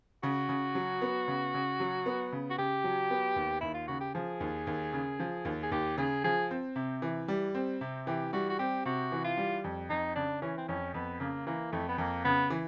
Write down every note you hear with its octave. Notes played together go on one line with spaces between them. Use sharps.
C#3 F#4
C#3
F#3
B3
C#3
C#3
F#3
B3
C#3
F#4
C#3 G4
F#3
B3
D#2
D#2 E4
F4
C#3 F#4
G4
F3 G#4
D#2
D#2
C#3
F3
D#2
G#4
D#2 G4
C#3 G#4
F3 G#4
C4
C3
E3
G3
C4
C3
E3 G4
G3 F#4
F#4
C4 G4
C3 F#4
E3
F4
G3
F2
F2 D#4
C#3 D4
E3 C#4
C4
F2 C#4
F2 B3
C#3 A#3
E3 A#3
F2 A3
B3
F2 A#3
C#3 B3
E3